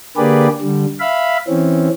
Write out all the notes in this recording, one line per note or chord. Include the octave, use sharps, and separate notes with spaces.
D3 A#3 G4 G#4 B4 D5
D3 G3
E5 F5 B5
E3 C4 C#4